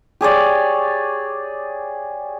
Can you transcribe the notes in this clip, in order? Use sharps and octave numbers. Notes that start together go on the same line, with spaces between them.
G4 G#4 C#5 D5